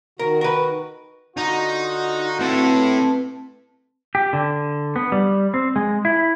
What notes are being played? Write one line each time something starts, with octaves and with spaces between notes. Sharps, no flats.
D#3 F#4 A#4
A#4 B4
D3 D#4 F4 F#4
A2 C4 A4 B4 A5
G4
D3
B3
G3
C4
G#3
E4